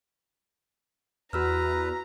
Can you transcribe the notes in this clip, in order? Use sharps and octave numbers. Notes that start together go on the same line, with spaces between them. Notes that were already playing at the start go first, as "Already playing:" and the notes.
E2 F#4 B4 A#5 E6 F6